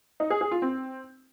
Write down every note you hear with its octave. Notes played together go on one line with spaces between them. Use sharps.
D#4
G#4
G#4
F4
C4